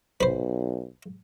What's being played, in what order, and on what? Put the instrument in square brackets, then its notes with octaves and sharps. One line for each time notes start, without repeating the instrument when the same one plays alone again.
[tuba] B1 [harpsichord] B4 C5